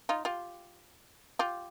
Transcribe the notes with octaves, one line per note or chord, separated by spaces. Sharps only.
D#4 F4
F4 G4
F4 G4